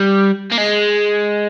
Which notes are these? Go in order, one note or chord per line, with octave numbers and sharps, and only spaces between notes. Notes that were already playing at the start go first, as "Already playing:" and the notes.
Already playing: G3
A#3
G#3